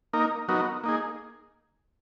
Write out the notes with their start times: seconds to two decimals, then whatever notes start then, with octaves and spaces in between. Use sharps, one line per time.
0.13 A#3 D#4 A#4
0.48 F#3 B3 D#4 F#4 A#4
0.84 A#3 D#4 G#4